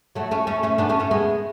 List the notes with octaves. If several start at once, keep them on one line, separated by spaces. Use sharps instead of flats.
F#3 A3
A3 C#4
A3 C#4
A3 C#4
B3 D4
A3 C#4
A3 C#4
G#3 B3